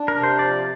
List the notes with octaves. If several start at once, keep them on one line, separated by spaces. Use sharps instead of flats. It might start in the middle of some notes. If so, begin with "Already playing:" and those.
Already playing: D4
A#4
C3
C5
F3 D5